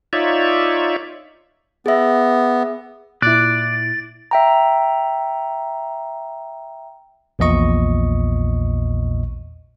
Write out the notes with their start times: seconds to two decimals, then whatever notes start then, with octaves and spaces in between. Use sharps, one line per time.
0.13 D#4 F4 C#5 D5 E5
1.86 B3 G#4 E5
3.22 A#2 E4 D5 F#6 A6
4.31 E5 G5 A#5
7.39 A#1 E2 A#2 D#5 C#6